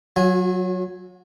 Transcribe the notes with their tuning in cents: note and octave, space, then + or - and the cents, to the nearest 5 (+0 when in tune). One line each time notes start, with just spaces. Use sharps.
F#3 +0 F#4 -45 G#5 +0